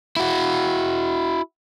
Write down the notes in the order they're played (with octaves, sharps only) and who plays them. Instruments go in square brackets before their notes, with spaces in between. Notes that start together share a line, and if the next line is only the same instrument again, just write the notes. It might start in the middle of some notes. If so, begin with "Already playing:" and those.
[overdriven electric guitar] E4 F#4